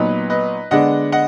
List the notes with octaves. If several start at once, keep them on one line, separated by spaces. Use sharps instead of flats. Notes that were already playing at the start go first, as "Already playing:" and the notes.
Already playing: A#2 F#3 B3 D#4 B4 D#5
B4 D#5
D3 G#3 B3 D4 D#5 F#5
D#5 F#5